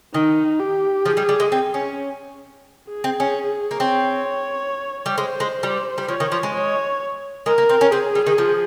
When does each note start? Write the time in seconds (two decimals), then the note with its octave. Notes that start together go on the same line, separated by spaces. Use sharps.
0.14 D#3 D#4
0.60 G4
1.05 F3 G#4
1.17 G3
1.29 G3
1.40 G#3
1.52 C4
1.74 C#4
2.89 G#4
3.04 C4
3.20 C#4
3.71 A#3
3.80 C4 C#5
5.06 G3
5.18 G#3 C5
5.40 G#3
5.63 G3
5.98 G3
6.08 F3 C#5
6.20 D#3
6.32 F3
6.43 G#3
6.55 C#5
7.46 G#3 A#4
7.58 A#3
7.69 C4
7.81 C#4
7.91 C4 G#4
8.15 G3
8.27 D#3
8.38 F3